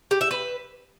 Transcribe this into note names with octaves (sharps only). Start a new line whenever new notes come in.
G4
E5
B4